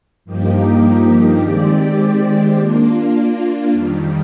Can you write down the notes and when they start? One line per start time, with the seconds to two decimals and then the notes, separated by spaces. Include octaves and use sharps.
0.25 G2 F3 A#3 D#4 G4
1.40 D#3 G#3 C4 G4 D5
2.56 A#3 D4 F4
3.71 F2 D#3 G3